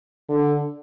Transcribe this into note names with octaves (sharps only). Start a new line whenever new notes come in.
D3